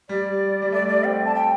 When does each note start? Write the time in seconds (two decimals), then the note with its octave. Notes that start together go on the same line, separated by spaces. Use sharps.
0.09 G3 D5
0.62 G3
0.72 A3 D5
0.83 G3
0.88 D5
1.03 C4 G5
1.25 A5
1.35 G5